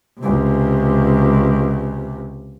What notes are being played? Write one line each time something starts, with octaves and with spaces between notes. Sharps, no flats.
C#2 C3